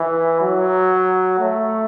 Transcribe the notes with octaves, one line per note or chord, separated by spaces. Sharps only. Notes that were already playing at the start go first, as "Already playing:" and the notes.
Already playing: E3
F#3
A3